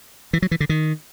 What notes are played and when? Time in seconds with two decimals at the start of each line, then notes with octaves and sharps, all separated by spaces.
0.33 E3
0.42 F#3
0.51 E3
0.60 D3
0.69 D#3